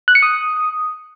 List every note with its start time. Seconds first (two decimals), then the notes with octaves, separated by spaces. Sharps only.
0.08 F#6
0.15 C#7
0.22 D#6